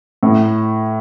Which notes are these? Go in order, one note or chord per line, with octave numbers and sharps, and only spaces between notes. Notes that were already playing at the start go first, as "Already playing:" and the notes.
A2